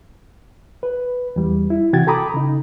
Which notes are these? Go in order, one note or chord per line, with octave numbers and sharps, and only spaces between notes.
B4
E2 G3
E4
C3 E3 F#4 G5 G#6 A6
A4 G5 A#5 B5 D6 D#6
C#3 D#4